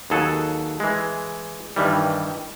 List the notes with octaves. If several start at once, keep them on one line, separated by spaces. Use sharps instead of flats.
D#2 F#3 G#4 A4 F#5
E3 G#3
G2 D#3 E3 G3